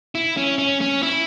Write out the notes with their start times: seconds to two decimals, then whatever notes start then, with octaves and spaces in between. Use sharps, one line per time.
0.15 E4
0.37 C#4
0.58 C#4
0.81 C#4
1.03 E4